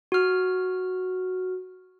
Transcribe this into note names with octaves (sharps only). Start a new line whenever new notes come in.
F#4 F6